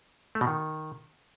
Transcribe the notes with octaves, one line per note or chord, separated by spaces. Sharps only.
A3
B2
D#3